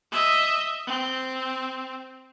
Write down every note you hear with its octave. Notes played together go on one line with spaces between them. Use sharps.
D#5 E5
C4